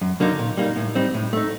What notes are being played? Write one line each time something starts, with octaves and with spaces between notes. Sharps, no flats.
F#2
D3 F#3 A#3 D#4
A#2
G3 A#3 D#4
A2
G3 C4 D#4
A2
A3 D#4